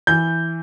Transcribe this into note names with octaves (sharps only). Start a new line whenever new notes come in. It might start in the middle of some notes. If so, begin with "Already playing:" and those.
E3 G6